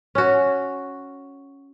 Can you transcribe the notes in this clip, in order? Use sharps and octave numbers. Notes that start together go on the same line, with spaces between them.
C#4 F#4